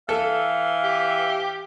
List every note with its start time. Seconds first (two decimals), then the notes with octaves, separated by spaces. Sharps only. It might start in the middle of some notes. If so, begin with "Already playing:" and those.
0.09 E3 A4 F5
0.84 G4